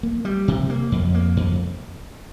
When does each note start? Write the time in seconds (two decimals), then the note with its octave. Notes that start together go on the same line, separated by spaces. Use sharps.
0.03 A#3
0.25 G3
0.48 C3
0.70 A#3
0.92 F2
1.15 A#3
1.37 F2